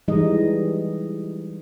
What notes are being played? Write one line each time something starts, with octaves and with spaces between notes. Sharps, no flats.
E3 G3 G#3 D#4 D#5